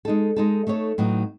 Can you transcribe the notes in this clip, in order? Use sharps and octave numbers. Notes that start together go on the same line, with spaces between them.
G#3 D#4 A4
G#3 D#4 A4
A3 D#4 A4 C#5
A2 F#3 B3 D#4